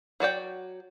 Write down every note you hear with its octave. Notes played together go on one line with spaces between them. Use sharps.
F#3 F#4 D5 G5